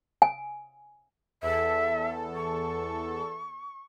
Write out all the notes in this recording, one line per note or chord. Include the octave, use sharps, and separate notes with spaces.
G#5
E2 A4 E5
C#6